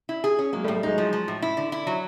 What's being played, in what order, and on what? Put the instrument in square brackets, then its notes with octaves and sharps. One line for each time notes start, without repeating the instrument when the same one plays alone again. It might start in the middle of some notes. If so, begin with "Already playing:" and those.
[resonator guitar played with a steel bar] E4
G#4
C#4
[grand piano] F#3 G#3 [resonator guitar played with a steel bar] A#3
[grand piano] G3 A3
[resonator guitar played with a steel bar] A2
[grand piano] G3 A3
[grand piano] F#3 G#3 [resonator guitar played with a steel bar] D#4
[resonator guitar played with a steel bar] F3
F3
A2
E4
D3
E4
F#3